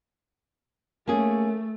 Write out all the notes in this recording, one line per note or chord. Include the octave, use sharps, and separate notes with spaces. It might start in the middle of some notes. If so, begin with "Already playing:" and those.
A3 A#3 C#4 G#4